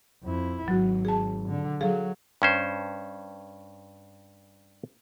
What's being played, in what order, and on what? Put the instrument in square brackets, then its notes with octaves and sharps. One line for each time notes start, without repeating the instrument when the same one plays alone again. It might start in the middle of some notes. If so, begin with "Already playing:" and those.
[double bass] F2 E4
[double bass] G#1 [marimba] F#3 F#4
[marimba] G#4 A5
[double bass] D3
[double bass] F#3 [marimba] G#4 A4 F5
[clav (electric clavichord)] G2 C#4 C5